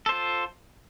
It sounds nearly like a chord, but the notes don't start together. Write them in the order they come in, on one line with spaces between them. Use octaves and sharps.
A4 C5 F4